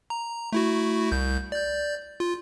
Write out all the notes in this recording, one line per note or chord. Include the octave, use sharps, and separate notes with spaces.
A#5
A3 E4 F#4
C2 G6
D5 G6
F4